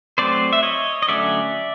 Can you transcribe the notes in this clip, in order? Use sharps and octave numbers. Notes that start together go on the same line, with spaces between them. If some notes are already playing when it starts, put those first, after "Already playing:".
F#3 A3 C4 C5 D5
E5
C#5 D#5
D#5
D3 F#3 A3 C#4 D5 E5